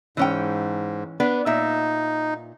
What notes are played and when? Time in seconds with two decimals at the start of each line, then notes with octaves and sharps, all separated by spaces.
0.17 G#2 E3 C#4 G5
1.20 B3 D4 B4
1.46 A#2 D#4 E5